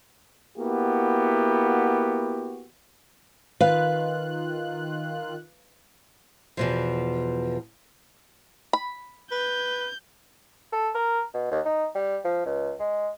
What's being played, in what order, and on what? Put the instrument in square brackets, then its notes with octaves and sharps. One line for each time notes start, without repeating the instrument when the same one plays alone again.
[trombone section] A#3 B3 E4 F#4 G4
[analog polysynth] D#3 F4 F#6 [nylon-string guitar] B4 F5
[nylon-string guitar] E2 B2 F3
[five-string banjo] B5
[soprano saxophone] B4 [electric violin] G6
[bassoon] A4
A#4
B2
D#2
D#4
G3
F3
C#2
G#3